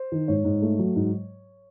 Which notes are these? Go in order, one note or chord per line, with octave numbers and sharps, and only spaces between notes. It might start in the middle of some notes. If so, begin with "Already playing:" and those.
Already playing: C5
D#3
G#2 C#5
G#2
A3
F#3
G#2